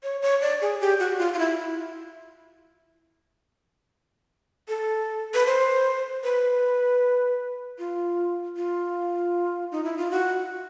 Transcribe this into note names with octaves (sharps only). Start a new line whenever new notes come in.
C#5
C#5
D5
G#4
G4
F#4
F4
F4
E4
A4
B4
C5
B4
F4
F4
D#4
E4
F4
F#4